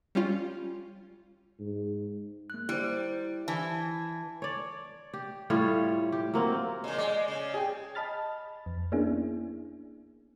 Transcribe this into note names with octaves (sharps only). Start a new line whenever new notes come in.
G3 C#4 F4
G#2
A#3 F#6
G3 E4 C5
E3 G#5 A5
C#5 D5
G4
A2 G3 F4 C#5
G4
F#3 A#3 C4
A#2 C#3 D#5
G#3 D5
C#3
G#4 G5
D#5 A5 B5 F6 A6
F2
A#3 B3 C#4 D4 E4 G#4